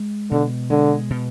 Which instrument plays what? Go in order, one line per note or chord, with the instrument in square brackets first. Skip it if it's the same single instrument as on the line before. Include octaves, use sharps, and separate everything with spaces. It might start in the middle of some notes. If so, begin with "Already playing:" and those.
Already playing: [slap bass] G#3
[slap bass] B2 [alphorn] D3
[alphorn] D3 [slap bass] G#3
[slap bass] B2